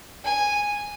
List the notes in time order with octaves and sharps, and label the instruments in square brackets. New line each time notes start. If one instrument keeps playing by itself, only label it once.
[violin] G#5